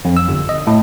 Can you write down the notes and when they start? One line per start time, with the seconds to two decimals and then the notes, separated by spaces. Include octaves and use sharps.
0.05 F2
0.17 E6
0.29 G1
0.49 D#5
0.67 A2